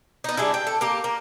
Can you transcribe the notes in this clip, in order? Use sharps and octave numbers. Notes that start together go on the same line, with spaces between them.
B3 D#4
G3 G#3 D4 E4
G5
A4
A#3 G4
A#3